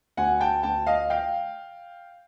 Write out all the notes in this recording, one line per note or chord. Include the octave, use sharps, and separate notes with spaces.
D2 F#5 G#5
G5 A5
D2 G5 A5
D#5 F5
F5 G5